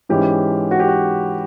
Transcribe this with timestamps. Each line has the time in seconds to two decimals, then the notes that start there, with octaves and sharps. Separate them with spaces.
0.09 G#2 E3 G#3 C#4 G4
0.71 F#4
0.80 G4
0.88 F#4